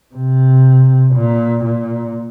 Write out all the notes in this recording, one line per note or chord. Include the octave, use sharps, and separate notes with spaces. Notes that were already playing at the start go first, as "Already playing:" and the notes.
C3
A#2
A#2